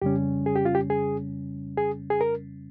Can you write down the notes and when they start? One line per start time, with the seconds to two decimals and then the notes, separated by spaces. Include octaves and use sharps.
0.02 F2 C#3 G3 C#4 G4
0.46 G#4
0.56 G4
0.65 F4
0.75 G4
0.90 G#4
1.77 G#4
2.10 G#4
2.21 A#4